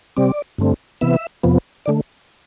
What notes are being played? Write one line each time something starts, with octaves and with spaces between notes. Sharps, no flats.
C3 G3 C4 D5
G2 D3 A3 C4
C3 E3 B3 E5
F2 C3 F3 B3
D3 A3 D5